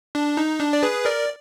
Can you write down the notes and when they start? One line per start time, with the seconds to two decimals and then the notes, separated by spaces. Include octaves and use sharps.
0.15 D4
0.37 D#4
0.60 D4
0.73 D5
0.83 G#4 B4
1.05 A#4 D5